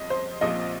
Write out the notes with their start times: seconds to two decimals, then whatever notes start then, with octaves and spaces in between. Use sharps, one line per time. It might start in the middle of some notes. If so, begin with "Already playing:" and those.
Already playing: G1 F2 D#5
0.10 C5
0.41 A#1 A#2 F3 C4 D#5